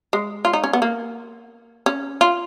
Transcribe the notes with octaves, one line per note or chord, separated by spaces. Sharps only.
G#3
F4
D#4
C#4
B3
A#3
C#4
F4